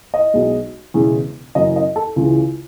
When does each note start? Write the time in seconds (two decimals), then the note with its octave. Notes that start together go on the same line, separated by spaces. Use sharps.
0.14 D#5
0.34 B1 B2 G#3
0.94 E1 E2 C#3 E3 G#3
1.55 F#1 F#2 E3 D#5
1.76 D#5
1.96 A4
2.16 C#2 C#3 E3 G#3